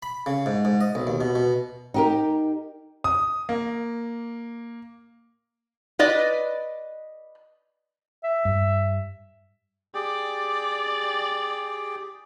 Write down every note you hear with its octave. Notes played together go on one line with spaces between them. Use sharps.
B5
C#3
G#2
G#2
D#5
B1
D#2
B2
B2
D#4 G4 A#4
D#6
A#3
B4 D5 D#5
E5
G2
G4 G#4 D5 G5